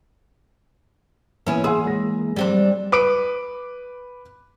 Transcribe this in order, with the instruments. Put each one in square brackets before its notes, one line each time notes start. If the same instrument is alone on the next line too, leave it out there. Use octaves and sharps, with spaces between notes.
[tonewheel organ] E3 A#3 [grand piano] B3 [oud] C#4 E4 G#4
[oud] G#4 [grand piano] F#5 C6 E6
[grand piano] G#3 A#6
[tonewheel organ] F#3 [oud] G3 C4 D4
[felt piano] B4 D6 D7